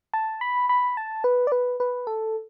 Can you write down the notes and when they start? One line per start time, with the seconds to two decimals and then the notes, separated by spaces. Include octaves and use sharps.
0.14 A5
0.41 B5
0.69 B5
0.97 A5
1.24 B4
1.47 D5
1.52 B4
1.80 B4
2.07 A4